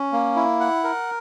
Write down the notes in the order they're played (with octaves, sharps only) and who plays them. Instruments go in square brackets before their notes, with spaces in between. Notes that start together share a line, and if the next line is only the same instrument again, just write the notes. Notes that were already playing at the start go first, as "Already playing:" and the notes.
Already playing: [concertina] C#4
A#3
E4
F#5
A#4